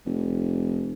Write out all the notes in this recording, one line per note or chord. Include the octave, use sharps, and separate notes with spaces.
F1